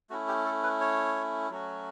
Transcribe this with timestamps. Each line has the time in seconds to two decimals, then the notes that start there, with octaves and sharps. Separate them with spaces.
0.10 A3 C#4 E4 F#4
0.28 G4
0.45 A4
0.63 B4
0.81 C#5
1.50 F#3 A3 C#4 F#4